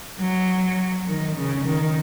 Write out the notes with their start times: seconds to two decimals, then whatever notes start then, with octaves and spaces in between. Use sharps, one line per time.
0.19 F#3
1.07 D#3
1.36 C#3
1.65 D#3